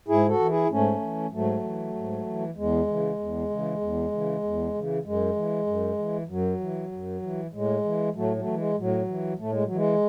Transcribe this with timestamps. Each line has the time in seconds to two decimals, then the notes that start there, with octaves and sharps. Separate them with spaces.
0.08 G#2 E4 G#4
0.28 F#4 A4
0.39 E3
0.49 E4 G#4
0.70 G#2 A3 C#4
1.01 E3
1.32 G#2 F#3 A3
1.64 E3
1.95 G#2
2.25 E3
2.56 E2 G#3
2.87 C#3 E3
3.19 E2
3.50 C#3 E3
3.81 E2
4.12 C#3 E3
4.43 E2
4.74 C#3 E3
5.05 F#2 G#3
5.36 E3
5.67 F#2
5.98 E3
6.28 F#2 F#3
6.60 E3
6.92 F#2
7.22 E3
7.53 A2 G#3
7.84 E3
8.15 A2 F#3 A3
8.36 F#3 A3
8.47 E3
8.57 G#3
8.78 A2 F#3
9.08 E3
9.39 A2 A3
9.52 G#3
9.64 F#3
9.70 E3
9.75 G#3